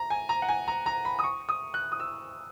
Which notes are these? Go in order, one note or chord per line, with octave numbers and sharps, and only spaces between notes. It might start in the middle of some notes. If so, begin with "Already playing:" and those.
Already playing: A#5
G#5
A#5
F#5
G#5
A#5
A#5
B5
D#6
C#6
D#6
F#6
D#6
E6